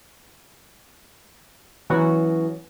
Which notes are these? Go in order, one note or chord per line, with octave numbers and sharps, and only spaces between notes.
E3 F#3 B3 C#4 F#4